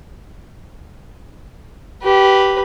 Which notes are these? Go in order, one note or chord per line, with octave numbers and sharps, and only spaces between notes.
G4 B4